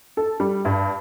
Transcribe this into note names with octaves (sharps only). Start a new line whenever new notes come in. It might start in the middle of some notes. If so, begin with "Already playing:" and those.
A4
G3
G2